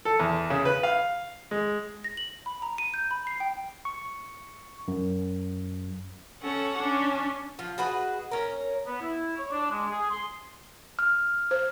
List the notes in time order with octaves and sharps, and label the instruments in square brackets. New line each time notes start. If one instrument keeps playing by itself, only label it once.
[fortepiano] A4
E2
C#3
B4
F5
G#3
[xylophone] A#6
F#7
B5
A#5
D#7
G6
B5
C7
G5
[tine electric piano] C#6
F#2
[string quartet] C#4 A4 C#5 F#5
C#4 D4
[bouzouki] F3 F4
F#4 G#4 B4 D#5
C#4 A#4
[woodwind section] B3
E4
C#5
D4
G#3
G#4
C6
[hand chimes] F6
[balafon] C5